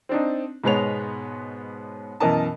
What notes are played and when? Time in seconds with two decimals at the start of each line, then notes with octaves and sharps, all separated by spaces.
0.09 C4 D4 D#4
0.64 G#2 B2 G#3 B3 C#5 F7
2.20 F#2 B2 E3 A#4 D#5 A5